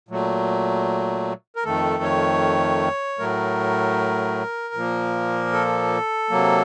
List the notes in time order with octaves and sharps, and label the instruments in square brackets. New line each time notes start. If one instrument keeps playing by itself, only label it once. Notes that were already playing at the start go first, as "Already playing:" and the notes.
[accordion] A#2 F#3 A3
A#4
F2 D#3 A3 A4
C#5
A2 F#3 A3 A#4
A#2 F3 A#3
A4
C3 F#3 A#3